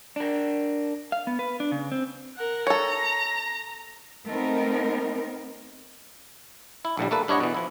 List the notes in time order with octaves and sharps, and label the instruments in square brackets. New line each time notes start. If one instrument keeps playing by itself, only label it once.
[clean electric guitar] D4 A#4
[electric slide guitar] F5
B3
B4
D4
C#3
C4
[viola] A#4 F#5
[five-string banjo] A4 C#5 [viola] A#5
[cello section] A3 B3 C4 D#4 A#4
[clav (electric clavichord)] E4
A#1 A2 D3 G3
A3 A#3 A4 B4
G2 D4 E4 C#5 D#5 F#5
B2 E3
F3 E4